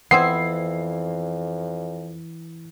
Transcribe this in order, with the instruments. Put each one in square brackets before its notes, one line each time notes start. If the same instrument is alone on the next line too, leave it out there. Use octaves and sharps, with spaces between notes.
[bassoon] F2 [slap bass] E3 [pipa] B3 C4 E4 [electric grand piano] C7